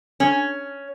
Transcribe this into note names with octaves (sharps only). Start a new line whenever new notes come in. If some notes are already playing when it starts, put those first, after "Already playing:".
C#4